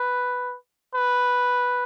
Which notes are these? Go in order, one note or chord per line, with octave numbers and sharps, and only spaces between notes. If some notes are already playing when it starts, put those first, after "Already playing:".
Already playing: B4
B4